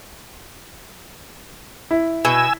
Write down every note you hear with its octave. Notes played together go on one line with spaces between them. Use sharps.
E4
B2 G#5 E6